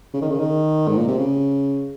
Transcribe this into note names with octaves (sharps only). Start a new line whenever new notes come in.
C#3
D#3
C#3
D#3
G#2
A#2
C3
C#3